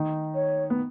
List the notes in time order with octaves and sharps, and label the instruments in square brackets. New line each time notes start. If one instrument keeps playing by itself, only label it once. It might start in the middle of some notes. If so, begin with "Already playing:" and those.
Already playing: [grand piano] D#3 D#4
[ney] C#5
[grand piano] B3